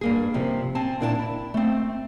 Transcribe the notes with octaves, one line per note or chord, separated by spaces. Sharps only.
G2 A#3 G#4
C3 F3
C4 G#5 A5
A#2 A#3 D4 E4 D5 A5
E4
A3 C4